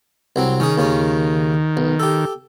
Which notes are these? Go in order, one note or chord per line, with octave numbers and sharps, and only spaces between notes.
C2 F#3 C4
D#3 C#4 G#4
D#2 C#3 C#4
B1
G4 A4